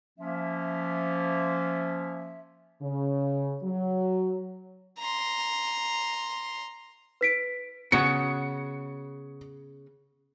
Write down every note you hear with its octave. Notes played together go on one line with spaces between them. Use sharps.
F3 A#3 C#4 E5
C#3
F#3
A#5 C6
B4 B6 D7
C#3 B3 F#4 C#7